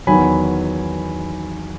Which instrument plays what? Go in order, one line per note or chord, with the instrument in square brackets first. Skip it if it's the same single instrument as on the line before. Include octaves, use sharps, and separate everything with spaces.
[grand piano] E2 D#3 F#3 G#5 B5